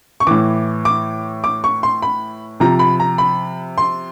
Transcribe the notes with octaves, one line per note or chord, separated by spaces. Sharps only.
C#6
A2 E3 D6
D6
D6
C#6
C6
B5
C3 F3 A#5
B5
A#5
B5
C6